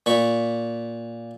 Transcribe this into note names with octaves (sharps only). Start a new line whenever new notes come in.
A#2 B5 C#6